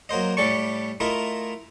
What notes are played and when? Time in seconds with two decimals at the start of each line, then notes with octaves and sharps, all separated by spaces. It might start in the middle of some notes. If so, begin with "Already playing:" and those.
0.09 F#3 A#3 C5 D#5
0.37 A2 G3 A4 D5 C#6
1.00 A3 E4 F4 A#4 D#5